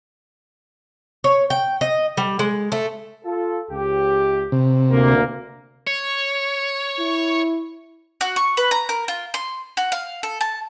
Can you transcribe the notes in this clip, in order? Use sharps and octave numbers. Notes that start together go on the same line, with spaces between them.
C#5
G5
D#5
G3
G#3
A3
F4 A4
C#2 G4
C3
D2 A#3
C#5
E4
F#4
C#6
B4
A#5
A#4
F4
C6
F#4
F5
A4
A5